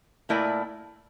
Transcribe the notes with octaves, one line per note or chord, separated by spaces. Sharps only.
A#2 A3 E4 A#4 D5